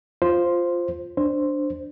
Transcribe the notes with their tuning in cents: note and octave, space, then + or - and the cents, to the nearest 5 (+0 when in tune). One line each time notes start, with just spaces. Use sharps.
F4 +0 C5 +0
D4 +0 C5 +0